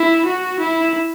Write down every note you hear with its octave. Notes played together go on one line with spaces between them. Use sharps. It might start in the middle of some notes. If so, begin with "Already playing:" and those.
Already playing: E4
F#4
E4